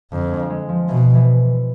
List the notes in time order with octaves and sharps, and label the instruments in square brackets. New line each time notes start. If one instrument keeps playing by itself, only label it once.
[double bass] F2 [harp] D3
[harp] G#3
G#3
F3
[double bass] B2 [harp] E3
[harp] E3